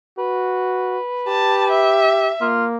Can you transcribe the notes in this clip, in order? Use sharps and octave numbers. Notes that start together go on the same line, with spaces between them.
F#4 B4
G4 A5
E5
A#3 F4